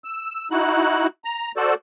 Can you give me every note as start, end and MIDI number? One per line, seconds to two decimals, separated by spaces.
0.04 0.48 88
0.51 1.07 63
0.51 1.07 64
0.51 1.07 66
0.51 1.07 90
1.24 1.52 82
1.57 1.74 66
1.57 1.74 69
1.57 1.74 72
1.57 1.74 74